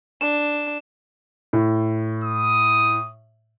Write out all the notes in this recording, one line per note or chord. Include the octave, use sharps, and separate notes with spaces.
D4 E7
A2
D#6